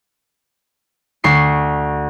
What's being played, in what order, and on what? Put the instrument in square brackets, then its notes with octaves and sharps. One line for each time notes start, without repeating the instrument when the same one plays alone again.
[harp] D2 C#6 C7